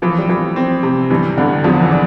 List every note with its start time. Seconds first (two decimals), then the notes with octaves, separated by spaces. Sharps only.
0.02 E3 F3
0.19 G3
0.29 E3 F3
0.56 C4
0.83 C3
1.10 G2 E3
1.37 G2 D3
1.64 E2 F3
1.82 E3
1.91 D4